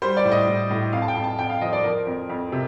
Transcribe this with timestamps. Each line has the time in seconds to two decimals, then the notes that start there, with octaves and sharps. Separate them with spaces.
0.02 G3 C5
0.17 D5
0.25 A2
0.32 D#5
0.48 A2
0.71 A2
0.93 F2 F5
1.02 A5
1.08 G5
1.15 F2
1.24 A5
1.39 F2 G5
1.50 F5
1.61 F3 D#5
1.73 D5
1.84 F3 A#4
2.07 F2
2.29 F2
2.52 C3